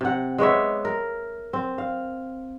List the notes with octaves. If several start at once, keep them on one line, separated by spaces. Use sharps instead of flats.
C3 F#5
G#3 B3 C#5 E5
A#4
C4
F5